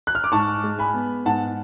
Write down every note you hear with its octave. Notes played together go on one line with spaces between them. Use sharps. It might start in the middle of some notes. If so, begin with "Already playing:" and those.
F#6
F6
D6
G#2 A5 C#6
G#3
G#5 B5
B3
G#2 F#5 A5